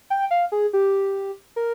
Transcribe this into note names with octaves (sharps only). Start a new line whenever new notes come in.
G5
F5
G#4
G4
A#4